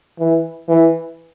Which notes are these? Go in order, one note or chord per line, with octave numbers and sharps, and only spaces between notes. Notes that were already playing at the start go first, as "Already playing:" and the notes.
E3
E3